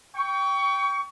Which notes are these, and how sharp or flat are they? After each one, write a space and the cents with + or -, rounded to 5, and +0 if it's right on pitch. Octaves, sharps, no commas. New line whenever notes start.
G5 +0 C#6 +30